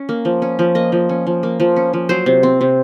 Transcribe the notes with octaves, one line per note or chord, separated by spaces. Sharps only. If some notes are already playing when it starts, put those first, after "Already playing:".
Already playing: C#4
A#3
F3
C#4
F3
A#3 D#5
F3
C#4
F3
A#3
F3
C#4
F3
F#3 C5
C3
C4
C3